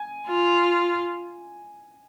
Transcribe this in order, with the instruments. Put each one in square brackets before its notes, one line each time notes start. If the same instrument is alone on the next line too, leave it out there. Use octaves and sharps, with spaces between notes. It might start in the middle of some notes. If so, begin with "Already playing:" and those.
Already playing: [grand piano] G#5
[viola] F4